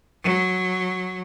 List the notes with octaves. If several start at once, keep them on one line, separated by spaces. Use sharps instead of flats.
F#3